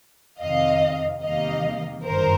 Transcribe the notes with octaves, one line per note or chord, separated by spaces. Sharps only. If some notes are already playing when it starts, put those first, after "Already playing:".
F2 C3 D#3 D#5 F5
E2 C3 D#3 G3 A#3 D#5 F5
G1 F#2 D#3 A#4 C5